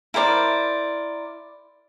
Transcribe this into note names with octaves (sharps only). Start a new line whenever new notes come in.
E4 A#4 C5 D5